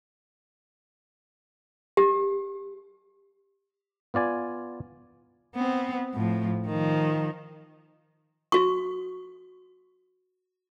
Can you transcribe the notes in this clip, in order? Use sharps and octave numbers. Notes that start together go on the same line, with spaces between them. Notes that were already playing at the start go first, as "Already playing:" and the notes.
G4
B3 F4 D5 G#5
B3 C4
A2 F3
D#3 F3
F#4 C#6